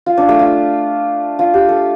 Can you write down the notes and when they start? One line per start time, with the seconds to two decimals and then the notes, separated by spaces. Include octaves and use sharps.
0.06 F4
0.17 D4
0.29 A3
0.39 F4
1.39 F4
1.54 G4
1.69 A4